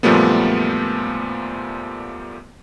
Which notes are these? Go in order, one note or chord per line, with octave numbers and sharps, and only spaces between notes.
F#2 A#2 F3 G3 A3 B3